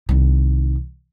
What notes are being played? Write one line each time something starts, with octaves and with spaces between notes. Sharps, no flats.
C2 D#3